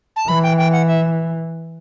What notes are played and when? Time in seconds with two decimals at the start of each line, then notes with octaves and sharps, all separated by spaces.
0.16 A5
0.28 E3 B5
0.43 G5
0.58 G5
0.72 F#5
0.87 E5